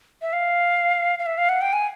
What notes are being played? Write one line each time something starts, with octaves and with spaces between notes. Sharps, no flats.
E5
F5
F5
E5
F5
F#5
G5
G#5